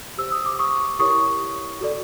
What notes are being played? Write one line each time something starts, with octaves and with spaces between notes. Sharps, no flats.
G4 C5 E6
D#6
D6
C#6 D#6
E4 G4 A#4 C#5 C#6 D#6
F#4 A4 D5